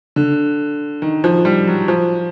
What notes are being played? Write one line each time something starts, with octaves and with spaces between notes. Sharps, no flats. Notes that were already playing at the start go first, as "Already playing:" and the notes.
D3
D#3
F3
G3
F#3
F3